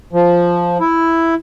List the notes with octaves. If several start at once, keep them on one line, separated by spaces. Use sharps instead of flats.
F3
E4